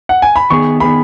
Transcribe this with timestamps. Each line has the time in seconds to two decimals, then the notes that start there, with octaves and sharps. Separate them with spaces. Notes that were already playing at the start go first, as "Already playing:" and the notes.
0.09 F#5
0.22 G#5
0.36 B5
0.50 D#3 B3 G#4 C#6
0.80 D#3 B3 G#4 B5